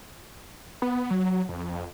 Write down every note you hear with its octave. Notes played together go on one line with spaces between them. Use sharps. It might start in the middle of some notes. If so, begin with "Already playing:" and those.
B3
F#3
F2